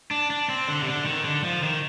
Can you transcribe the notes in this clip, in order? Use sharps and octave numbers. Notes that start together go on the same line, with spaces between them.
D4
D4
C4
D3
C3
D3
D#3
D3
F3
D#3